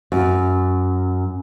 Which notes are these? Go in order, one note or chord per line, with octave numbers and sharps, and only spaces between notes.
F#2